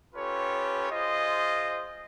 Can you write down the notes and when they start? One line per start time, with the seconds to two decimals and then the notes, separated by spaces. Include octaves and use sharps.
0.14 C#4 F4 G4 A4 B4 C#5
0.89 F4 G#4 C5 D#5